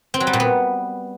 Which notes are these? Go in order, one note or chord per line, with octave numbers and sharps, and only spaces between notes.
C4
F#3
G3
A#2
B3